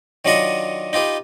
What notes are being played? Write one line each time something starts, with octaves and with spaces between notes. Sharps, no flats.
D#3 F#3 D4 F4 D#5 C#6
D#4 F4 G4 B4